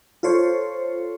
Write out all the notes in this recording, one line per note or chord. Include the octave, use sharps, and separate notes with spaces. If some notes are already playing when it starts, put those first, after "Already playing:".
F4 A4 C5 C#5